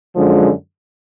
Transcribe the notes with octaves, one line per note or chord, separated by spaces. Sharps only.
F#2 D3 F3 G#3